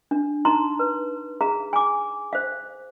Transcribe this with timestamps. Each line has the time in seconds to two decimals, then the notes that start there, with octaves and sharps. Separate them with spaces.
0.11 D4
0.45 D#4 A#5 C6
0.79 B4
1.41 G#4 F5 A#5
1.73 G#5 D6
2.33 C5 F5